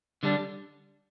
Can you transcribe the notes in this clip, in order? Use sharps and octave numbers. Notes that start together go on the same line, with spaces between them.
D3 G3 D4